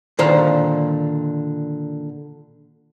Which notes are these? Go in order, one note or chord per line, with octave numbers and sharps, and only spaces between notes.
A#2 D3 D#3 C5 F5